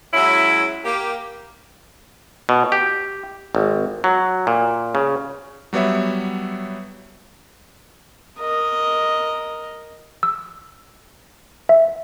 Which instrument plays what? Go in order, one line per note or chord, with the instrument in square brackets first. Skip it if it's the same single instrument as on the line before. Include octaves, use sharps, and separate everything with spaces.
[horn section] F#3 G#3 C#4 E4
A#3 G4
[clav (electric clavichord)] B2
G4
G#1
F#3
A#2
C#3
[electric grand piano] F#3 G3 B3 C#5 E5
[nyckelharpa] A#4 D#5
[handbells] E6
E5